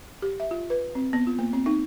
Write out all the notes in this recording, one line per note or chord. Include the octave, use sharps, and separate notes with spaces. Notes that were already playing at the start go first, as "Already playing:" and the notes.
G4
E5
F4
B4
C4
B3
F4
A#3
C4
D#4